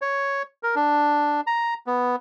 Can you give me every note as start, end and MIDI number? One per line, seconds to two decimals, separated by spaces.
0.02 0.43 73
0.63 0.75 70
0.75 1.41 62
1.47 1.74 82
1.87 2.16 59